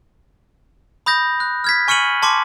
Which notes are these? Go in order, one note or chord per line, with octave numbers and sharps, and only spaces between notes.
B5 D#6 G6 A#6
F#6
F6 G#6 B6
G#5 C#6 F6 C#7 D#7 F#7
A5 C6 D6